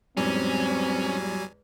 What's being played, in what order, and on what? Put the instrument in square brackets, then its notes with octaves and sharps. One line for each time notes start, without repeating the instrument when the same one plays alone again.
[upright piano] E2 G#2 [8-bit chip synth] F#3 G3 G#5 [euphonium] C4 [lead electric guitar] C#4